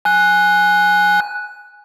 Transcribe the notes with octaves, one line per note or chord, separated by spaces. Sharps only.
G#5 F#6